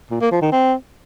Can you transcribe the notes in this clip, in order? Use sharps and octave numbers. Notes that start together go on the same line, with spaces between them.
A#2
A#3
F3
D#3
C4